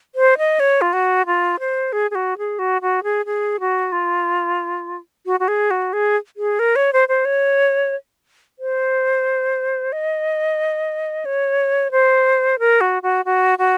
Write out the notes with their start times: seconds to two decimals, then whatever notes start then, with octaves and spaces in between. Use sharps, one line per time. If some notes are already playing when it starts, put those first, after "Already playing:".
0.15 C5
0.38 D#5
0.60 C#5
0.81 F4
0.93 F#4
1.26 F4
1.59 C5
1.92 G#4
2.11 G#4
2.15 F#4
2.38 G#4
2.59 F#4
2.82 F#4
3.03 G#4
3.26 G#4
3.60 F#4
3.92 F4
5.26 F#4
5.40 F#4
5.48 G#4
5.71 F#4
5.93 G#4
6.37 G#4
6.59 A#4
6.76 C#5
6.93 C5
7.08 C5
7.25 C#5
8.59 C5
9.92 D#5
11.25 C#5
11.91 C5
12.59 A#4
12.81 F#4
13.03 F#4
13.25 F#4
13.58 F#4